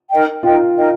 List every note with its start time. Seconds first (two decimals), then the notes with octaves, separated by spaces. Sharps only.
0.10 D#4 A#4 D#5 G5
0.43 D#4 F4 A#4 D#5 G5
0.76 D#4 A#4 D#5 G5